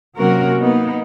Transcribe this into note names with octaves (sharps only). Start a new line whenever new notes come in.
C3 F#3 A#3 C#4 F#4 A#4
A#3 B3 D#4